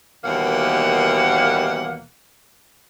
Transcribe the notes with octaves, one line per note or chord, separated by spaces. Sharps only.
D#2 B2 E3 G3 A#3 F#5